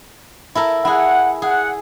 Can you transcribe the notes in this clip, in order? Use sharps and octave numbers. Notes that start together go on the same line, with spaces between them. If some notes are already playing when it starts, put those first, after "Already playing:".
E4 A4 A#4
E4 G#4 F#5
G#4 F#5